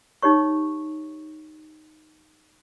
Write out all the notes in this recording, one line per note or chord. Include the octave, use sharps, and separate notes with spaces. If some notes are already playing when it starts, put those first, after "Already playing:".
D#4 G4 C#5 C#6